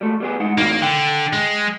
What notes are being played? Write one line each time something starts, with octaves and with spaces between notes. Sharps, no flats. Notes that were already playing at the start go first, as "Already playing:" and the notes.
G3 A3
G3 B3 G#4
G#3 D#4 F#5
A2 E3 A#3 D#4
D3 G5
G#3